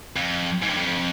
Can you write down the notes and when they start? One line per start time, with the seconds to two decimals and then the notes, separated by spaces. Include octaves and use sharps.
0.16 F2
0.63 G#2
0.70 G2
0.77 F2